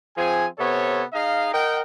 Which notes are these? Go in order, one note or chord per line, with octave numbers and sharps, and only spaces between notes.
F3 C4 G#4 G#5
C3 B3 A4 C#5
D#4 G#4 D#5 F5
A#4 D#5 F#5 G5